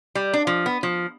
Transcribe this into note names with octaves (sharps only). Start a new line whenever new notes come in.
G3
D4
F3
B3
F3